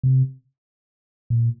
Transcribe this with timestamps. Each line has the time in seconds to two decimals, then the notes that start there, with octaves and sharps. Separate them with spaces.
0.03 C3
1.30 A#2